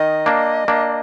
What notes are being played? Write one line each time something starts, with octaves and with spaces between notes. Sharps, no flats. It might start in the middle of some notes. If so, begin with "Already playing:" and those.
Already playing: D#3 D#5
A#3 D4
A#3 D4